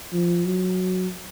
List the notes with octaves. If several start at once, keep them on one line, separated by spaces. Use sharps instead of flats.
F3
F#3